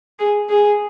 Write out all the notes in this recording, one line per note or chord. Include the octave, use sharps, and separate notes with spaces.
G#4
G#4